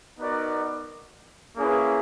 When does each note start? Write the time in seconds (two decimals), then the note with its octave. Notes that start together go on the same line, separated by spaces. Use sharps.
0.19 B3 D#4 F#4 A#4 D5
1.57 A#3 C#4 E4 G#4 B4